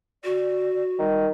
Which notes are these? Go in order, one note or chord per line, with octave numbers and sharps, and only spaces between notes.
F#4 D5
D#3 G3